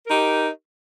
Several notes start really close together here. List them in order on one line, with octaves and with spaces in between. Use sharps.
A#4 D#4 G4